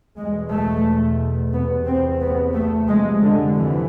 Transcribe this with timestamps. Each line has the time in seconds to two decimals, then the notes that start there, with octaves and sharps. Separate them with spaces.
0.16 E2 B2 G#3
0.50 A3
1.52 E2 C3 B3
1.86 C4
2.21 B3
2.54 A3
2.87 F2 C3 G#3
3.22 D3
3.56 E3